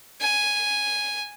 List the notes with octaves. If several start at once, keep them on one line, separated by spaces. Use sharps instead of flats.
G#5